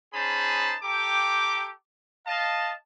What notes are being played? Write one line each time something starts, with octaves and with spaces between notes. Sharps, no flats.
C#4 D#4 G#4 C5 A5 B5
G4 A4 G5 A#5 D6
D#5 F5 A5